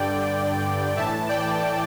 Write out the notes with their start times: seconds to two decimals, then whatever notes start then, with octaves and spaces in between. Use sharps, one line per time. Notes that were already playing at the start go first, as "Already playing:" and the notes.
Already playing: G2 D3 D5 G5
0.97 A2 E3 E5 A5
1.29 D5 G5